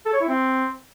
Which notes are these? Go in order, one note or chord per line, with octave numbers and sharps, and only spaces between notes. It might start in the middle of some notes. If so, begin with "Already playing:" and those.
A4
C#5
E4
C4